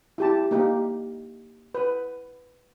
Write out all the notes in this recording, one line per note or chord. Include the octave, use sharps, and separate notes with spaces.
E4 G4 A5
A#3 D#4 G4
B4